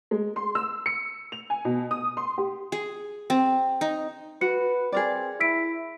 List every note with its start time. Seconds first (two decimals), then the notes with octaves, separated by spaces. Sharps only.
0.11 G#3
0.36 C6
0.55 E6
0.86 C#7
1.32 F7
1.50 G#5
1.65 B2
1.91 D#6
2.17 C6
2.38 G4
2.72 G#4
3.30 C4
3.81 D#4
4.41 F#4 B4 C#7
4.92 C4 G#4 A#4 D5
5.40 E4 E6 B6 D7